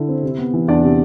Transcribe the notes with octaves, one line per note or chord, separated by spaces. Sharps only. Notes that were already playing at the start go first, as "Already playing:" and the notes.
Already playing: D3 E4
C4
C3
B3
E3
E2 D4 D5
C3